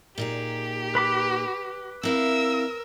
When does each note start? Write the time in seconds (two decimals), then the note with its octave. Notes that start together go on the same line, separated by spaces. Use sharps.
0.18 A#2 D#4 G4 G#4
0.95 B4 B5 D6
2.03 C4 E4 A#4 F5 E6